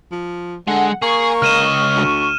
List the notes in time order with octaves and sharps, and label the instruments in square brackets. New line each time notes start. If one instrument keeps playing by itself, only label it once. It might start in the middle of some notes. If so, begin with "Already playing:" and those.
[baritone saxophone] F3
[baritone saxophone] D3 [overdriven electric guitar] G#3 [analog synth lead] F#5
[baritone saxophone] A#3 [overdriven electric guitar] G#4 [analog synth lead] C#6
[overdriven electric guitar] C#2 D#5 [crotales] F6 D#7 E7
[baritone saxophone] D2